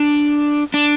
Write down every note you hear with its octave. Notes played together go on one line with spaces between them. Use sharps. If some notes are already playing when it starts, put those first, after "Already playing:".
Already playing: D4
D4